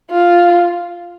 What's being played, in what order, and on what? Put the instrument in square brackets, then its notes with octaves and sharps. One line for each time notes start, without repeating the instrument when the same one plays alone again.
[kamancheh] F4